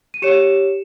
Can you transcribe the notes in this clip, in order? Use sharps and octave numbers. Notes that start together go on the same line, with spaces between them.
D#7
G4 C#5 C#7 E7